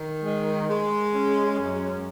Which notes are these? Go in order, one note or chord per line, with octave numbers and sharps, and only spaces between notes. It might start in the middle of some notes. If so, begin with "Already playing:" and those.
Already playing: D#3
G#3
G#3
C#4
F#2